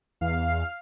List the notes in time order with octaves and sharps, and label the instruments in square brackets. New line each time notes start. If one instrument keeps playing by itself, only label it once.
[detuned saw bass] E2 [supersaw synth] F5